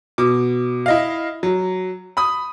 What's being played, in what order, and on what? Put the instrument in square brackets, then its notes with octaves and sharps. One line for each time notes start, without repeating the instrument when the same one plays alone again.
[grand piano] B2 D6
E4 D#5 F5
F#3
B5 D#6